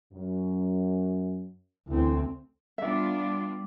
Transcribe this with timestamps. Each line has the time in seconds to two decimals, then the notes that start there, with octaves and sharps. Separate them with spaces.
0.13 F#2
1.88 D2 E3 C4
2.78 G3 B3 D4 F4 E5 D6